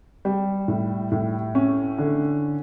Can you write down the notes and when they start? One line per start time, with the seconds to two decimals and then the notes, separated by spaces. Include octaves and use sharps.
0.25 G3
0.68 A2
1.12 A2
1.55 C#4
1.99 D3